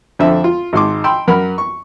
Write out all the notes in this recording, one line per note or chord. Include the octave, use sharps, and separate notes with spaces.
F2 D3 C4 E5
F4
G#1 G#2 C6 D6
G5 B5 C6 E6
F#2 A#4 F#5 B5 F6
C#6